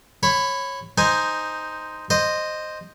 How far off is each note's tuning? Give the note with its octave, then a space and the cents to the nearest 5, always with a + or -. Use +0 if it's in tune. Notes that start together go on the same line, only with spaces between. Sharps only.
C#5 -15 B5 +15
D#4 +0 C5 -5 G#5 +0
C5 +0 D#5 -10